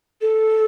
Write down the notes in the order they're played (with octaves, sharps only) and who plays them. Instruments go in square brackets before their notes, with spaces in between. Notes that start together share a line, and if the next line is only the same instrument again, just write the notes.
[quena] A4